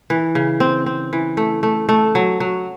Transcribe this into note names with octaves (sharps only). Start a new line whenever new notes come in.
E3
C#3
C4
C4
E3
A3
A3
A3
F#3
F#3